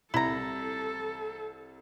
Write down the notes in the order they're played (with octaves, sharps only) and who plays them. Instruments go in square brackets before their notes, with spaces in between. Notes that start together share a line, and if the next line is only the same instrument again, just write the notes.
[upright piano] C2 [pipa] E4 A#5 [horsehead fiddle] A4